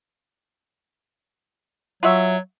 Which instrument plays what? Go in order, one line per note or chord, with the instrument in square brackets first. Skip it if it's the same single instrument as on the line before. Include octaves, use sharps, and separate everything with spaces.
[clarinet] F#3 [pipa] F4 F#4 E5